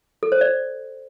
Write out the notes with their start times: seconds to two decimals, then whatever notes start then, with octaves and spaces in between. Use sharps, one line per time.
0.23 A4
0.32 C5
0.41 D5